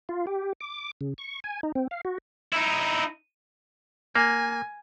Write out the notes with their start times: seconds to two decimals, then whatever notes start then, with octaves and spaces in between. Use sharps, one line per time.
0.09 F4
0.27 G4
0.61 D6
1.01 C#3
1.18 C#6
1.44 G#5
1.63 D#4
1.75 C4
1.91 F5
2.05 F#4
2.53 D#4 E4
4.15 A#3 G#5